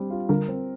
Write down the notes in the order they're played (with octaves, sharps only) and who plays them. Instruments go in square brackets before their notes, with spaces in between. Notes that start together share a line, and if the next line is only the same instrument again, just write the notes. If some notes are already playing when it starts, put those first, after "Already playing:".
Already playing: [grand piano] G3 C4 D4
F4
[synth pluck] D3 G3 [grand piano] A#4
[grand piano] C4